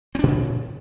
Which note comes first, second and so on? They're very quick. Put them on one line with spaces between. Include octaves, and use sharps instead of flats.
C4 D4 A#2 C#3